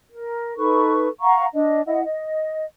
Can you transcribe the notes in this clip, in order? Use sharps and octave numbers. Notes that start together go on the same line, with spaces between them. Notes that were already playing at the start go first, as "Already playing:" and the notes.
A#4
D#4 A4 B4 C#6
F5 F#5 A#5 C#6
D4 D#5
E4 D#5 F#5
D#5